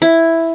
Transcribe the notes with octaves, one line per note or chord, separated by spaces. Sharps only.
E4